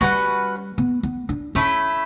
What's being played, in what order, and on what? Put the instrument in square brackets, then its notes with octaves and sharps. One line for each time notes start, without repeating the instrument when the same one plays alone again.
[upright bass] G3 [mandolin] C#4 F#4 B4 F#5
[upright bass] B3
B3
D4
[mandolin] A3 E4 A4 E5 [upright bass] C#4